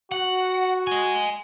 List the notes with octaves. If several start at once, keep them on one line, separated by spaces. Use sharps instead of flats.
F#4 F#5
D#5 G#5